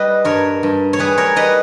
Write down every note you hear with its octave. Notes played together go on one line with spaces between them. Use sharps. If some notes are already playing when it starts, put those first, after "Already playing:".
Already playing: G3 B4 D#5 G5
G2 A#4 C#5
G2
C#5
G3 G#4 B4
A#4 C#5
G3 B4 D#5